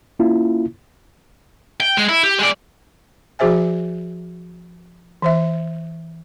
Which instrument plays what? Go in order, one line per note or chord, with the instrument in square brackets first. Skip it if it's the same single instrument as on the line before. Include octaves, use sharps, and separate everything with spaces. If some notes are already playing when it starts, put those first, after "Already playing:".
[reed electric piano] A#3 C#4 E4 F4
[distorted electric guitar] G5
G#3
E4
G4
G#3 D5
[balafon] F3 F#4 G#4 C5 E5 G#5
E3 C5 E5